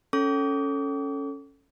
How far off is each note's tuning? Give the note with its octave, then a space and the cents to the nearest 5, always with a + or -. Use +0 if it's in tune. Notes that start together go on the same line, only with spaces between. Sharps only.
C#4 +0 A4 +5 D6 -45